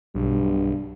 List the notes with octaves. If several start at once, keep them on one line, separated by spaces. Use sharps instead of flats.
B1 G2